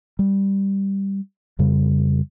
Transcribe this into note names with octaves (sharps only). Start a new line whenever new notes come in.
G3
F2 C#3 G3